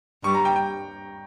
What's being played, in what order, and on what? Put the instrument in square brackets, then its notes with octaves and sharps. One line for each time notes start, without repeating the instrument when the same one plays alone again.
[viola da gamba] G2 G3 [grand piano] C#6
[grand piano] A#5
G5
G5